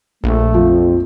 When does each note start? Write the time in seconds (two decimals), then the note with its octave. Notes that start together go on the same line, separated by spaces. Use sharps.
0.24 A#1 A3
0.54 F2 F3